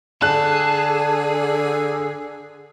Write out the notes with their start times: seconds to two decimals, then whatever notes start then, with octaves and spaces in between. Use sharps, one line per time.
0.22 D3 G#4 A5 F#6